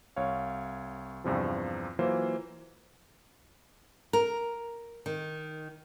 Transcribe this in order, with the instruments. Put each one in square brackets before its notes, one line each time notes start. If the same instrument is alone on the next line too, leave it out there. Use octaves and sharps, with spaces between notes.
[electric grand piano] C2 C#5 F5
E2 G2 C3 F3
E3 F#3 A#3 F4 C5
[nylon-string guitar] A#4
D#3